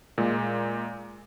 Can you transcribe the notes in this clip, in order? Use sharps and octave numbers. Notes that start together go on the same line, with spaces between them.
A#2 G#3